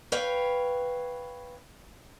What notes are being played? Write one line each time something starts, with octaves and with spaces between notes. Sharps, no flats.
B4 C#5 F5 G5